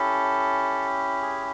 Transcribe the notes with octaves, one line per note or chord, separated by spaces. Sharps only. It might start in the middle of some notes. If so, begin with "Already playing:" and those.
Already playing: C#4 E4 G4 A4
G#4